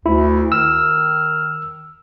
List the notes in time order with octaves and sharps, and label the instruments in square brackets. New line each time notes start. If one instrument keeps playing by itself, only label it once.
[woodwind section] D2 [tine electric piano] E4
[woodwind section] D#3 F6 [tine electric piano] E6